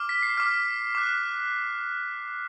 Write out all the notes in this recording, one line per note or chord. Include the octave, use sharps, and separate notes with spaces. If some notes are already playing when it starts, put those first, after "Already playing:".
Already playing: D6 F6
B6
C7
D6 F6
D6 F#6